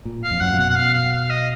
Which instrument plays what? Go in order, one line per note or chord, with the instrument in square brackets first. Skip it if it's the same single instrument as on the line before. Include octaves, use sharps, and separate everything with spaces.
[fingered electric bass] A#2
[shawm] F5
[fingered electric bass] F2
[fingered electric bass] F#2 [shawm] F#5
[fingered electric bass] A#2
[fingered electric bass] B2 [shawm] F#5
[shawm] F#5
F5
F5
F5
D#5